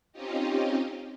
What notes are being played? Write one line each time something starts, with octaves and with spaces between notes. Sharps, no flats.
C4 C#4 D#4 F4 G4 D#5